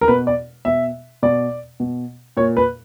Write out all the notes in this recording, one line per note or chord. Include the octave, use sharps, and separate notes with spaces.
A#4
B2 B4
D5
B2 E5
B2 D5
B2
A#2 C#5
B4